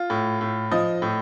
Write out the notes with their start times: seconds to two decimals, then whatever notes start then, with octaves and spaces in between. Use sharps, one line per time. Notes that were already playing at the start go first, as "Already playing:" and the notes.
Already playing: F4
0.10 A2
0.41 A2
0.72 F3 D#5
1.02 A2